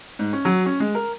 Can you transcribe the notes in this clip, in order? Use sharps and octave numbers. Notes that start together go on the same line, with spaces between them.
G#2
C#4
F#3
C#4
G#3
A#4